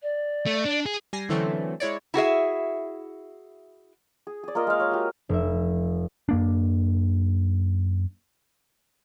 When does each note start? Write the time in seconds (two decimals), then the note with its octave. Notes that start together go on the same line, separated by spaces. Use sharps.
0.03 D5
0.46 A3
0.65 D4
0.86 G#4
1.13 G3 G#5 A#6 C7
1.29 D3 E3 F#3 A3 C4 C#4
1.80 G#3 E4 C#5 D5
2.14 E4 F#4 G#4 E5
4.27 G#4
4.44 G#4 D5
4.55 A#3 F4 A#4 D#5
4.67 G#3 F5
4.80 G#4 C#5
4.92 F#4 G4
5.29 F1 E5
6.29 F#2 A#3 D4